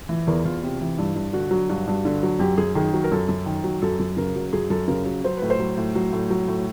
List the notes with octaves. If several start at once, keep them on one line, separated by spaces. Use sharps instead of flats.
E3
E2 A#4
E2 F4
C3 F4
E3
G2 E4
G2
D3 F#4
F#3
G2 F#4
G2
D3
F#3
F#2 G4
F#2 G#4
D#3 G#4
F#3
A#4
F#2 A4
F#2
D#3
F#3
F#2 A4
F#2
C#3 A#4
F#3
F#2 G#4
F#2 A4
C#3 A#4
F#3
F#3 C5
A2 B4
C5
F#3
A2
F#3
A2
F#3
A2